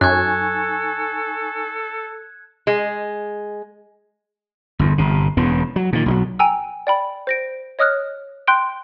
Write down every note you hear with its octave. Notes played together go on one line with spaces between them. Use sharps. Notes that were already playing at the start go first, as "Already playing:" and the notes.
F#2 D#4 A4 G#5 C#6 F#6 G#6
G#3
G1 E2
G1 C3
E1 E2 C#3 B3
F#3
A#2 D#3
B1 F3 F#3
G5 G#5 A#5 E6
D5 G5 B5
C5 A#6 D7
C#5 D#5 D#6 F6 F#6
G5 C6 F#6 G6 D7